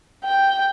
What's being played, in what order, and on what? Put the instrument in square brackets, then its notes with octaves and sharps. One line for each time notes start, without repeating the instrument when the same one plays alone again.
[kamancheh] G5